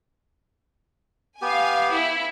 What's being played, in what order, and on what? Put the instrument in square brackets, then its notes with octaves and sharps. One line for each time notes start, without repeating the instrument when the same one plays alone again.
[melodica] B3 G4 [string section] F5 G#5
[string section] E4